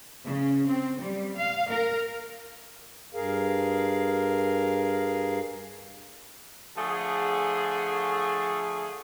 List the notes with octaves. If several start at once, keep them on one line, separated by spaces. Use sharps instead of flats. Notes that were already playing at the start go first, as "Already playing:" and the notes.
C#3
C4
G3
F5
A#4
G2 G#4 A#4 F5
D3 F3 A3 G#4